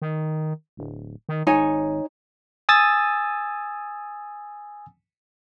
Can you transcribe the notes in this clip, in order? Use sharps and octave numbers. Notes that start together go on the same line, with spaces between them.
D#3
D1
D#3
G#1 D#4 C#5 G#5
G#5 D#6 E6 A6